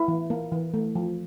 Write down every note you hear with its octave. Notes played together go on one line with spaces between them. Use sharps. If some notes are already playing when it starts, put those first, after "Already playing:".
Already playing: E4
E3
A#3
E3
A3
F3